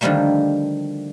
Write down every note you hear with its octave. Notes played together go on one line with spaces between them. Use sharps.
D3 D#3 F3 G3 A3 A#3